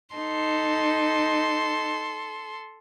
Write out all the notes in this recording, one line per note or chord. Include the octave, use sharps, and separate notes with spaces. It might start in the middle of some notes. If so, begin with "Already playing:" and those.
D#4 A4 C6